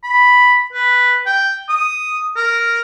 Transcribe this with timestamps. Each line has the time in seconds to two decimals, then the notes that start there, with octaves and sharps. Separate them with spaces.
0.03 B5
0.73 B4
1.26 G5
1.69 D#6
2.36 A#4